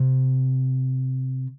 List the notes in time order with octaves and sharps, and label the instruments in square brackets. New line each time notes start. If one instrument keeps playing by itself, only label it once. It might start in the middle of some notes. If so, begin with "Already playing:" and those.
Already playing: [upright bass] C3